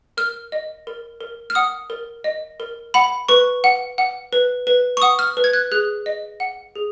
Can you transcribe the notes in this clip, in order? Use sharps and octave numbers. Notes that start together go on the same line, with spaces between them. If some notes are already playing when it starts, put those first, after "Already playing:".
A#4 F6
D#5
A#4
A#4
F6
F#5 D#6
A#4
D#5
A#4
F#5 B5
B4 C#6
F#5
F#5
B4
B4
C#6
F#5 D#6
F6
B4
G#6
F#6
G#4 F#6
D#5
F#5
G#4